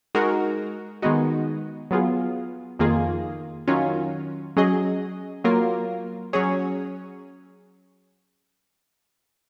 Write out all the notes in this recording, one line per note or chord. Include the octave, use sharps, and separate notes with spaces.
G#3 D#4 F#4 A#4
D#3 G#3 B3 D#4 F#4
F#3 B3 F4 G#4
F2 D#3 A#3 F4 G#4
D#3 F#3 C#4 F4
F#3 C#4 G#4 D#5
F#3 A#3 F4 A#4
F#3 C#4 G#4 C#5